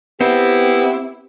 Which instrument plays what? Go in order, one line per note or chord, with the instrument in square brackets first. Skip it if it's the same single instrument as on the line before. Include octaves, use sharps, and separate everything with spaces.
[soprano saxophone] B3 [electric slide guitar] C4 [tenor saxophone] E4 [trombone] G4